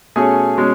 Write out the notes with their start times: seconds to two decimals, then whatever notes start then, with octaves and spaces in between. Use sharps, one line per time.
0.16 B2 A3 C#4 G#4 G#5
0.57 B2 G#3 C#4